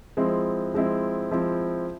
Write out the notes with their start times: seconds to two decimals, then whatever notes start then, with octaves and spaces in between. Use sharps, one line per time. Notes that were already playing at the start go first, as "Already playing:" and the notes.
0.17 F3 G#3 C4 E4
0.74 F3 G#3 C4 E4
1.31 F3 G#3 C4 E4